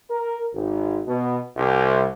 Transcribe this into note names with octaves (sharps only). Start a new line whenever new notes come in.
A#4
G#1
B2
C2